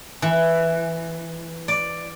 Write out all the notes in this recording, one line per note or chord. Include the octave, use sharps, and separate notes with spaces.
E3
D5